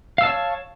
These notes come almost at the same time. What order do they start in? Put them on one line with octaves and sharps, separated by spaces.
F5 E6 A5 C#5